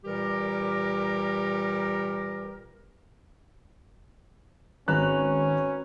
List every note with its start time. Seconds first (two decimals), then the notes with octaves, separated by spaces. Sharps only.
0.05 A#2 E3 G3 G4 A#4
4.88 G#1 C#4 F#4 B4 A#5 F#6